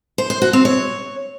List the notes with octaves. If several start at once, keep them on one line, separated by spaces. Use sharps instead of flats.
C5
C5
F#4
C4
C#5